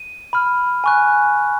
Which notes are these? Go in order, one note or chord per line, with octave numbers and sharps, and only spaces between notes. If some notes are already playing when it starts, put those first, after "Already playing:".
Already playing: D#7
B5 F6
G#5 C#6 F#6